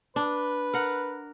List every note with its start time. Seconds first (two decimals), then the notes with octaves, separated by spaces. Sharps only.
0.16 D4 B4
0.74 A#4 F#5